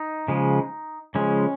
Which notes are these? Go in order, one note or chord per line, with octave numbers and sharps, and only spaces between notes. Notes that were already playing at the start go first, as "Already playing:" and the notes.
Already playing: D#4
C#3 F3 G#3
C#3 F3 G#3 C#4